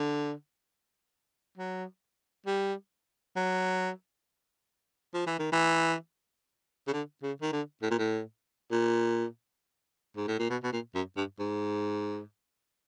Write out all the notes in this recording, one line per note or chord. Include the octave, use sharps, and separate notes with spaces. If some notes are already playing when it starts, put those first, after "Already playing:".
Already playing: D3
F#3
G3
F#3
F3
E3
D#3
E3
C#3
D3
C#3
D#3
D3
A2
A#2
A2
A#2
G#2
A2
A#2
B2
B2
A#2
F#2
G2
G#2